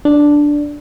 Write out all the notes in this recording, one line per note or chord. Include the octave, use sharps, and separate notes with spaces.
D4